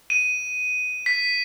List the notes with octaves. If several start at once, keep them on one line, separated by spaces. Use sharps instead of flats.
D#7
B6